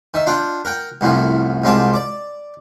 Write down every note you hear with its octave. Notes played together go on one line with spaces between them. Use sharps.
D#3 E5
D4 F4 F#5 G5
A#4 F#5 G5
C2 F#2 A2 F3
C2 G#2 C4 F4 A5 D6
D5 D6